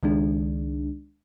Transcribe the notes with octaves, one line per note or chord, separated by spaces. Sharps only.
C#2 D#3 G#3 D4